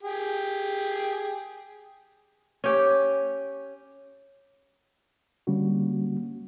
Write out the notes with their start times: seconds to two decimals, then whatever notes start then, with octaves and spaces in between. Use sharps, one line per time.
0.03 G4 G#4
2.64 C#4 G4
5.47 D3 G3 A#3 C#4 F#4